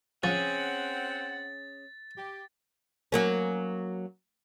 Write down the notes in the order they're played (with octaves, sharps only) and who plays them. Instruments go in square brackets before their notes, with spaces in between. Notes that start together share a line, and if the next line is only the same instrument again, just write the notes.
[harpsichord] F3 [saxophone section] C4 F#5 [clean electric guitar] C#4 G#4 [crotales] A6
[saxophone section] G4
[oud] F#3 A#3 C#4